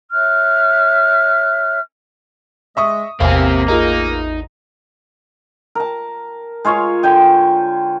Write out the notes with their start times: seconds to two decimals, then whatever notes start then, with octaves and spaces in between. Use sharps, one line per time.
0.12 C#5 E5 F6 F#6
2.77 G#3 D#5 E5 C#6 D#6
3.20 A1 E2 C3 A#3 C4 F5 G#5
3.68 D#4 F4 G#4 A#4
5.75 A#4 A5
6.65 G#3 F4 C#5 F5
7.03 D3 G5 G#5